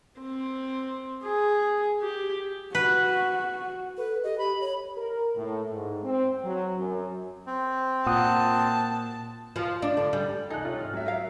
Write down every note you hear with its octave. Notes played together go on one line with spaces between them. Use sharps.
C4
G#4
G4
F#4 B4
A4 B4
G4 D#5
B5
C#5
A#4
A2
G#2
C4
F#3
F#2
C4
A#2 F#5 A5 D#6 F#6
F3
D4
D3
G3
C2 D#4 A4 G#5 F#6
F4 C#5 E5 G5
G#2 F6
F#3 E5
A#4 F5